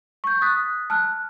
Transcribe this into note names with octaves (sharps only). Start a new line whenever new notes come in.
C#6 G6
D#6 F#6 A6 B6
A5 F6 F#6